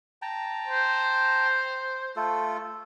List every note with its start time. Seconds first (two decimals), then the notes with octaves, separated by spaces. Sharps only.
0.22 G5 A5 A#5
0.68 C5
2.16 A3 F4 A4